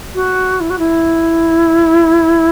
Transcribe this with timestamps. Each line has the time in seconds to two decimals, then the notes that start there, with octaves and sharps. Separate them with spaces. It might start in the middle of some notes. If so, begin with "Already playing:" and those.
0.14 F#4
0.60 E4
0.70 F#4
0.78 E4